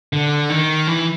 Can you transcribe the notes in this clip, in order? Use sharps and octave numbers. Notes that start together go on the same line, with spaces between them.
D3
D#3
E3